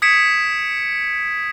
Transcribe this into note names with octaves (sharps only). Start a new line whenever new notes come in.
D#6 G#6 B6 C#7 D7 E7